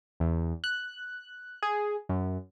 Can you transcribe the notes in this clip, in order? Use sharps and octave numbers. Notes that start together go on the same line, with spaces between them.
E2
F#6
G#4
F#2